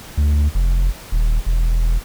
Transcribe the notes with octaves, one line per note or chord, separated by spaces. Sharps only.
D2
F1
D#1
E1